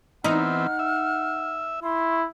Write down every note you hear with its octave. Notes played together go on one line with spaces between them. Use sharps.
E3 B3 C4 D#4 F#5 F6
E5
E4 C6